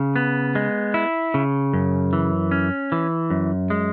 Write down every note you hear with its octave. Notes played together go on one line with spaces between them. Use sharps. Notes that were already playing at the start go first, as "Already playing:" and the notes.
Already playing: C#3
B3
G#3
E4
C#3
F#2
E3
C#4
E3
F#2
G#3